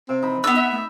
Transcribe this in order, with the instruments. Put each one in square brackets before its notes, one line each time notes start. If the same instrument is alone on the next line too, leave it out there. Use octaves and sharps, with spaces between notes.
[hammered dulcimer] C3 [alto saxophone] C4
[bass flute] E3 [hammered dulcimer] D#4 B5
[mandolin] B3 E6 [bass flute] D4
[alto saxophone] E5 [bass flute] F#5
[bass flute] A3